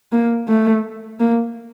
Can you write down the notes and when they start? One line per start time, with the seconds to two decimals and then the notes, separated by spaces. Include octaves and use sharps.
0.12 A#3
0.48 A3
1.20 A#3